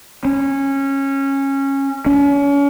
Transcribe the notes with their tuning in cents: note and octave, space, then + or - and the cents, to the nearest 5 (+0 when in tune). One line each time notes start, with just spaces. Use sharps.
C#4 -15
C#4 +35